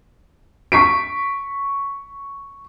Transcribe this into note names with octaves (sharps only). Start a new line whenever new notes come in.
C#6 B6 D7